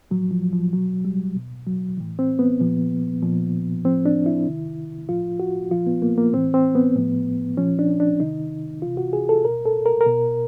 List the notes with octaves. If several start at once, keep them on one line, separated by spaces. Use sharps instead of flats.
A2 F3 F#3
F3
F3
B2 F#3
G3
B2
F#3
A2 E3
C4
B3
A#2 F3
A#2 F3
A2 F3 C4
D4
E4
C3 D#3
A2 F3 F4
F#4
A#2 F3 F4
B3
A#3
A#3
A2 E3 C4
C4
B3
A2 F3
A#2 F3 C#4
D4
D4
C3 D#3 D#4
C3 E3 F4
F#4
G#4
A4
B2 A#4
A4
A#4
A#4
B2